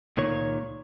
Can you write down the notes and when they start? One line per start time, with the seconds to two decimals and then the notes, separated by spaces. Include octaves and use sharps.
0.17 C#2 A#2 D#3 C#5